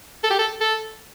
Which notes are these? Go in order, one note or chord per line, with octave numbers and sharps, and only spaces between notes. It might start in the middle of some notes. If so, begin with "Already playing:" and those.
A4
G4
A4
A4